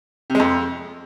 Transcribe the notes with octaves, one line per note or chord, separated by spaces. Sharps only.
C3
G#3
F2